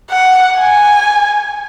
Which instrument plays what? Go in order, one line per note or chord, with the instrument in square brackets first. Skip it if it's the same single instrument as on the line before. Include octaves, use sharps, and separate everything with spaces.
[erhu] F#5
G#5